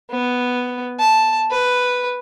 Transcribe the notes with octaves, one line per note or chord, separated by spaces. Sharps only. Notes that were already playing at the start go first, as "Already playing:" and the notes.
B3
A5
B4